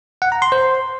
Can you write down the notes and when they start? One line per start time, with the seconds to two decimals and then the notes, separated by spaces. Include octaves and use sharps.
0.22 F#5
0.32 A#5
0.42 C6
0.52 C5